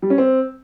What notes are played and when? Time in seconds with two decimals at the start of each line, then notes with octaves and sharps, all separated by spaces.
0.02 G3
0.10 C#4
0.18 C4